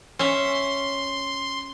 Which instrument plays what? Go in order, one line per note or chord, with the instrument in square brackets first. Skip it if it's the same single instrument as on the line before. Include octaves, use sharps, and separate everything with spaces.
[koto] C#4 C#5 E5 [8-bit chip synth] C6